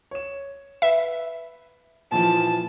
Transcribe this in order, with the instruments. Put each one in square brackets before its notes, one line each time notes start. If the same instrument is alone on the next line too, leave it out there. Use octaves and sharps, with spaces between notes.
[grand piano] C#5 E7
[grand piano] B4 [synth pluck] E5
[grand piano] A#2 E3 F3 [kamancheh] A5